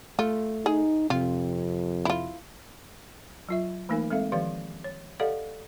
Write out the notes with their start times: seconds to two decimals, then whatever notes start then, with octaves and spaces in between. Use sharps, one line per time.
0.19 A3 F4
0.66 D#4 G#4
1.10 F2 C3 F4
2.05 E4 F4
3.49 F#3 F4 E5
3.89 E3 A3 A#3 D#4 A#4 G#5
4.11 G#3 C4 A4 E5 F5
4.32 D#3 F3 G4 B4 D5 F5
4.84 C#5
5.20 G4 A4 D5 D#5 F5 F#5